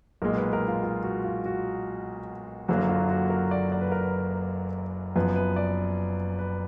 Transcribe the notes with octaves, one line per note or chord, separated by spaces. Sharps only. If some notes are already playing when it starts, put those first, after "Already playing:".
B1 A#2 G#3 A#4
B4
A#4
F4
F4
F#4
F4
F#4
F#1 F#2 D3 F#3 A#3 F#4
F4
F#4
A#4
D5
D5
B4
A#4
B4
F#1 F#2 F3 B3 B4
B4
D5
B4